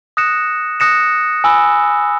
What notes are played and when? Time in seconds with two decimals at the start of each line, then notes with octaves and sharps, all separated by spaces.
0.17 D#6 F#6 A#6 C#7 E7
0.80 D#6 F#6 A#6 C#7 E7
1.44 G#5 B5 E6